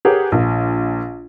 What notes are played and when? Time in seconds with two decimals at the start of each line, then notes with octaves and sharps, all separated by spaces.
0.05 G4 G#4 A#4 B4 C#5 F#5
0.32 A#1